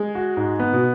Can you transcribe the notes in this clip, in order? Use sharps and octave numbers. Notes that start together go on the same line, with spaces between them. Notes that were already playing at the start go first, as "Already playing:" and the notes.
Already playing: G#3
F#4
G#2
B3
B2